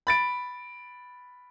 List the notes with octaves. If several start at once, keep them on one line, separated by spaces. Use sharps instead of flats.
B5 A6 D7